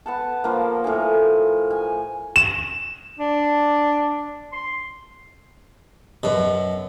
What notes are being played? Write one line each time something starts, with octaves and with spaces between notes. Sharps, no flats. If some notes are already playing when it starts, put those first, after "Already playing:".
B3 F#5 A5
F3 A#3
A2 A#4 G#5
G#5
E7
D4
C6
F#2 B2